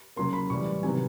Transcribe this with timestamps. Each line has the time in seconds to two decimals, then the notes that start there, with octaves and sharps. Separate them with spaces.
0.16 C#3 F#3 A#3 C6
0.33 B5
0.50 A2 E3 G3 C#6
0.83 C3 D#3 F#3 B3 G#5